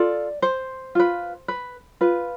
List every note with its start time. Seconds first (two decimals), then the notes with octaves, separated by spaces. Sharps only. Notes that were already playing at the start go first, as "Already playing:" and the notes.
Already playing: F4 A4 D5
0.42 C5
0.95 F4 B4
1.48 B4
2.01 F4 B4